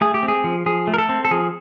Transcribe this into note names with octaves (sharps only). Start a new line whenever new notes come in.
A3 G#4
G4
C4
G#4
F3
F3 G#4
A3
A#4
A4
C4
A4
F3 G#4